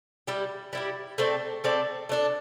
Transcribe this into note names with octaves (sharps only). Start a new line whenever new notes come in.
G3 E4 G4
G3 E4 G4
A3 C4 A4 D5
A3 C4 A4 D5
A3 D4 A4